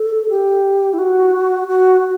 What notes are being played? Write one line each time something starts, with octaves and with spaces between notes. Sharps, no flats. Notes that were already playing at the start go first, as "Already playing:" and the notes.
Already playing: A4
G4
E4
F#4
F#4